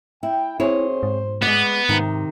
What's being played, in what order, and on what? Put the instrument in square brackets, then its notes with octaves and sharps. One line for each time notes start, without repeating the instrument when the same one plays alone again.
[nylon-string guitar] E4 [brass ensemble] G5
[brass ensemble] B1 C5 [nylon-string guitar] C4 G#4 C#5 [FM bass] E4
[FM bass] G#2
[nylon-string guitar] G#3 D5 [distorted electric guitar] B3
[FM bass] G#2 [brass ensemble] C3 [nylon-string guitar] D#3